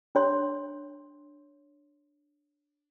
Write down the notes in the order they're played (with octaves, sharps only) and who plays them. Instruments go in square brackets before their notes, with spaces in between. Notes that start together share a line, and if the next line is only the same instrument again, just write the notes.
[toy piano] D4 C#5 C6